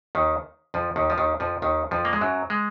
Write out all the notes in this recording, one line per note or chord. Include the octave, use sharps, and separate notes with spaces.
D#2 D#3
F2 F3
D#2 D#3
F3
D#2 D#3
F2 F3
D#2 D#3
F2 F3
A#3
G#3
F#2 F#3
G#3